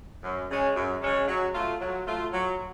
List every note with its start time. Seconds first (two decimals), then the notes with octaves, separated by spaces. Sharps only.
0.24 F#2
0.50 C#3 G#3 C#4
0.76 F#2
1.02 C#3 G#3 C#4
1.28 F#3
1.54 A3 F4
1.81 F#3
2.07 A3 F4
2.33 F#3